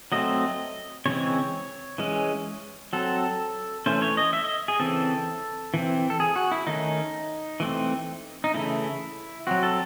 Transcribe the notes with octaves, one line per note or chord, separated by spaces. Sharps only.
F#3 A3 C4 D#5
C#3 E3 G#3 C4 C#5
E3 G#3 C#4
F#3 C4 A4
E3 A3 C#4 C5
C#5
D#5
E5
D#5
G#4
C#3 E3 C4 A4
E3 C4
A4
G#4
F#4
E4
D#3 A3 C#4 D#4
E3 A3 C4
D#4
C#3 E3 A3 E4
F#3 C4 F#4
A4